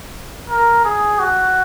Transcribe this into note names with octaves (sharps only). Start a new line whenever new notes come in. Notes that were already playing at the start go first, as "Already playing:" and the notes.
A#4
G#4
F#4